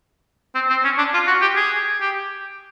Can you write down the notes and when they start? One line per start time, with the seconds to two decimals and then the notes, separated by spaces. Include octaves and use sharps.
0.55 C4
0.69 C4
0.84 C#4
0.98 D4
1.13 F4
1.27 F#4
1.42 G4
1.56 G#4
2.00 G4